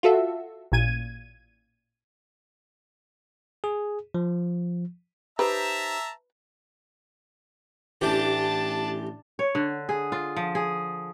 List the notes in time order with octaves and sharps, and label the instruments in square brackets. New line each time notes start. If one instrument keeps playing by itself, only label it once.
[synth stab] F4 F#4 A4 E5
A1 A#2 G#6 D#7
[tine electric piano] G#4
F3
[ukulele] D#4 G4 C5 [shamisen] B4 [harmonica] E5 A5 A#5
[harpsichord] A1 E3 G4 [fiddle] D4 A5
[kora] C#5
D3
G#4
F4
F3
G#4